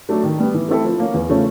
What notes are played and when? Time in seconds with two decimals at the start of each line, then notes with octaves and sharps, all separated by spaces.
0.09 F#3 A3 D4
0.24 D#3
0.39 G3 B3
0.54 E3
0.69 A3 C4 E4 A4
0.85 F3
0.99 A#3 C#4
1.14 E2
1.29 C#3 F3 A3 C#4